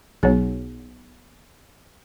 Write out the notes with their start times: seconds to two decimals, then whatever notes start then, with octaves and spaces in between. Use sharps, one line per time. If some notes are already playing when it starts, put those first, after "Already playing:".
0.23 B1 F#3 B3 D#4 G#4